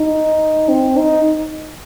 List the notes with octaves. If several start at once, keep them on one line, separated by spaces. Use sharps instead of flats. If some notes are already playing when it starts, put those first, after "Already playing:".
Already playing: D#4
C4
D#4